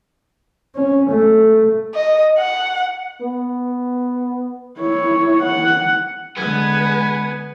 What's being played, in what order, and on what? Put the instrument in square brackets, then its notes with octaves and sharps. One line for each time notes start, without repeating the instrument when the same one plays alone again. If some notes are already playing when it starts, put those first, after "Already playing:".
[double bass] C#4
A3
[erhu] D#5
F#5
[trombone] B3
[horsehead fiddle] E4 C#5
F#5
[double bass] D3 G#3 [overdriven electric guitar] B3 [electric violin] B4 G#5